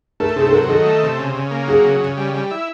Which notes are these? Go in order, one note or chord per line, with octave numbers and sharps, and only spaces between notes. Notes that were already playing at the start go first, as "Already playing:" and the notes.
A3 A#4
C3 G#4
A4
F#3 A#4
D#3 A4
A3
C3
C#3
C#3
A#3
F#3 G#4
C#3
C#3
G3
G3
E4